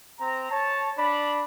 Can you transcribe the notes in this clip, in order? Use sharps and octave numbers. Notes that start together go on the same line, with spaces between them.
C4 A#5
C#5 A5
D4 B5